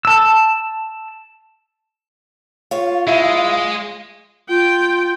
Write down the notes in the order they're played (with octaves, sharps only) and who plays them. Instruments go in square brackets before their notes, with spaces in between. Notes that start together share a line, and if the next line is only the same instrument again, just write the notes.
[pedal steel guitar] A5 E6
[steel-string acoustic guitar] F4 C#5 [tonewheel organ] F5
[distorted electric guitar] G#3 [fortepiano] E4
[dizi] F4 [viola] G5